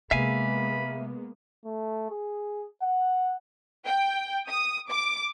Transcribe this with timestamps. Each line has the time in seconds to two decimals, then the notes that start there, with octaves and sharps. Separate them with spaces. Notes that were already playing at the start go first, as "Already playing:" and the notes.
0.11 C3 G#3 A#3 B3 E5 F5 G#5 B5
1.65 A3
2.10 G#4
2.82 F#5
3.86 G5
4.48 D#6
4.89 D6